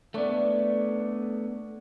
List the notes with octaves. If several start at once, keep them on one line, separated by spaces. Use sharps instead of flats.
A3 B3 D4 C#5 D5